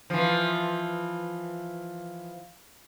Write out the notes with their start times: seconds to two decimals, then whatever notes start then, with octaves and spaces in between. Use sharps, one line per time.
0.10 E3 F3